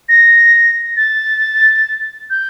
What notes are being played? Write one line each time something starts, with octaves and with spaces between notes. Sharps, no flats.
A#6
A6
G6